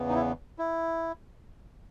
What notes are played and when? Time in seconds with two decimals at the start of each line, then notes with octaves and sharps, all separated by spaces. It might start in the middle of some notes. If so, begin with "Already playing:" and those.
Already playing: E2 C#3 E3 B3
0.09 D#4
0.15 E4
0.59 E4